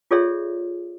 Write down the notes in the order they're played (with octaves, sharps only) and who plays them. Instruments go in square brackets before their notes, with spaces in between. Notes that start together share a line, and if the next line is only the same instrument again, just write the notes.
[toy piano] F4 G#4 A4 C#5 D5 E5